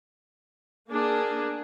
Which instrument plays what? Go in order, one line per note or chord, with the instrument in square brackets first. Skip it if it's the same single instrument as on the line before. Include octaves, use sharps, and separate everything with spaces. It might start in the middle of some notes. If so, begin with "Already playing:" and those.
[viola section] A#3 D4 G#4